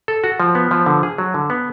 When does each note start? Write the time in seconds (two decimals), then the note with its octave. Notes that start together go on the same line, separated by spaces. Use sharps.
0.08 A4
0.24 F#4
0.40 F3
0.55 B3
0.71 F3
0.86 D3
1.03 G#4
1.18 F#3
1.34 D3
1.50 B3